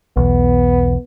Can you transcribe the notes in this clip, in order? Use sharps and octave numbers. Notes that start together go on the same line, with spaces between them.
B1 E2 B3